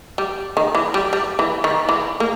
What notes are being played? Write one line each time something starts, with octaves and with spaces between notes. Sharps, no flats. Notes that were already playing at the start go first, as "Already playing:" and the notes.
G3
D#3
E3
G3
G3
E3
D#3
E3
A#3